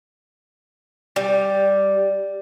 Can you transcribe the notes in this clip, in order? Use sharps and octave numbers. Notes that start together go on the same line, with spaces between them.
G3